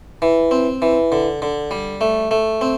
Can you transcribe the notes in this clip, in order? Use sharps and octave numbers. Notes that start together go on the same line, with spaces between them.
E3
C4
E3
D3
D3
G3
A3
A3
C4